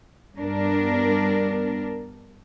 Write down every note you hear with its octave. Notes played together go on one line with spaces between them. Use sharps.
G2 B3 D4 A#4